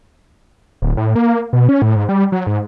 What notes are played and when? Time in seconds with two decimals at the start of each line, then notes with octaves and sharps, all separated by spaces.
0.82 D1
0.97 A2
1.16 A#3
1.53 B2
1.69 C#4
1.82 A2
1.96 G#2
2.09 G3
2.32 F#3
2.47 G#2